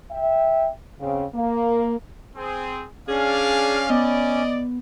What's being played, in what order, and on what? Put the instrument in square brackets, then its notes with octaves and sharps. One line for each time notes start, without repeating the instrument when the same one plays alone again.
[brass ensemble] E5 G5
C#3 C4 F5
A#3
[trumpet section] C4 G#4
[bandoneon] C#4 [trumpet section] D4 D5 F5 [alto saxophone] G#4
[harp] B3 [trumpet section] D5 [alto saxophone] D#5